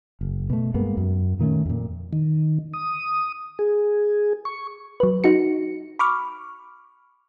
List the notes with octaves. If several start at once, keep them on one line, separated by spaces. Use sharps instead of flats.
F#1
B2 A3
G2 G#3 A#3 B3
F#2
A#2 D#3 A3 C#4
F2 A#2
D#3
D#6
G#4
C#6
F#3 B4
D#4 F#4 C#7
B5 C#6 D6 F6